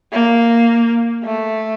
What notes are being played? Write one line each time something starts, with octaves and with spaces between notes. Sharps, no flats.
A#3
A3